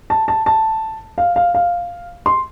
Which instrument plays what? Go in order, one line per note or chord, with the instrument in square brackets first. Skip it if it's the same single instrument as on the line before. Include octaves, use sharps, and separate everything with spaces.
[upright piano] A5
A5
A5
F5
F5
F5
C6